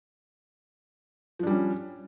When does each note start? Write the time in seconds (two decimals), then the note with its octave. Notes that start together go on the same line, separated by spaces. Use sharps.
1.39 F3
1.43 D4
1.47 G3
1.50 C#4